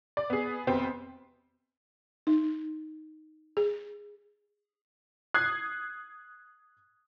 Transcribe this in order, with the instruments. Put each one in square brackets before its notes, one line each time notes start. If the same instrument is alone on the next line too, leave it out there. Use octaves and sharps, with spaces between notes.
[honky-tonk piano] D5
B3 G#4
F1 B3 C4
[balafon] D#4
G#4
[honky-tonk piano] D#6 F#6 G#6 C7